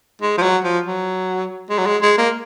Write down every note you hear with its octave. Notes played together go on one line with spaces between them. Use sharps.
G#3
F3
F#3
F3
F#3
G#3
F#3
G#3
G#3
A#3